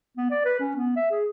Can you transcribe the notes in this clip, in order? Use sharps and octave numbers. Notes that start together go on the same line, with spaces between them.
B3
D5
B4
C#4
B3
E5
G#4